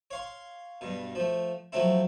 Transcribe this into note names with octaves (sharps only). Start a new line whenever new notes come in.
C#5 F5 C6
G2 B2
F3 A3
F3 F#3 A3 C4 E4